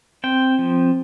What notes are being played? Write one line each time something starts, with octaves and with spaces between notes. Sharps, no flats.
C4 G5
F3